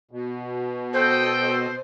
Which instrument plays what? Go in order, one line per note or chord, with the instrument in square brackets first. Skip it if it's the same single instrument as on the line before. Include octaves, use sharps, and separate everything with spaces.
[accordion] B2
[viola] A4 D#5 [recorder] C5 [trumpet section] G5